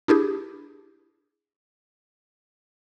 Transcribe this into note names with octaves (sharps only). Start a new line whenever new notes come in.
D4 E4 G4 G#4